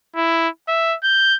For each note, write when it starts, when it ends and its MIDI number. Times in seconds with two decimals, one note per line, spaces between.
0.16 0.48 64
0.68 0.96 76
1.04 1.36 91